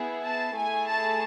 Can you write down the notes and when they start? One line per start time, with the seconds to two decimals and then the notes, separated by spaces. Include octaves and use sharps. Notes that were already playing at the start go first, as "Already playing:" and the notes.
Already playing: B3 E4 G#4
0.22 A5
0.54 A3 E4 G#4 G#5
0.86 A5